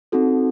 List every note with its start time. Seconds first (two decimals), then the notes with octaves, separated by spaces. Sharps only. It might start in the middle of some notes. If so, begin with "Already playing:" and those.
0.12 C4 D#4 F#4 A4